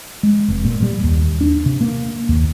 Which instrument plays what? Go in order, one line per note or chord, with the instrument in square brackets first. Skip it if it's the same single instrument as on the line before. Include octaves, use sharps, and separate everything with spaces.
[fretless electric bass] G#3
F1
A#2
G3
D#2
D4
C3
A#3
D#2